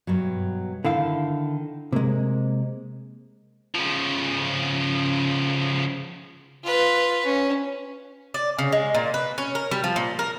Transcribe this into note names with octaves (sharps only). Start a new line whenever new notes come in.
G2 B2 F#3
D3 D#3 E4 F5
C3 G#3 A#3
C#3 F3
F4 B4
C#4
D5
C#3
G#3
A#2
B4
C#4
A#4
G3
F3
A#2
A#4